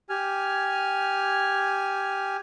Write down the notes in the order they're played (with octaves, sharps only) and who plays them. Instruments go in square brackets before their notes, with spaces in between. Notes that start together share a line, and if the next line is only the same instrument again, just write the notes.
[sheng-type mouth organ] G4 G#5 F6